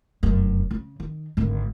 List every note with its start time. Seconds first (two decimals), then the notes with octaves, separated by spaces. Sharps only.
0.23 F1 F#2
0.71 C#3
1.00 D#3
1.37 G#1 D3